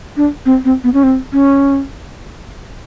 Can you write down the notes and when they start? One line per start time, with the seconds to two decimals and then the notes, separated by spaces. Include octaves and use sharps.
0.17 D4
0.46 C4
0.65 C4
0.84 B3
0.94 C#4
1.03 C4
1.33 C#4